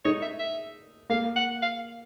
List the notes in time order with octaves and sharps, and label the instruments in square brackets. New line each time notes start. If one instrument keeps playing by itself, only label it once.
[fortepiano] D#4 [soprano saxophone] C#5
[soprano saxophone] E5
E5
[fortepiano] A#3 [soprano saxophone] F5
[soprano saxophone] F#5
F5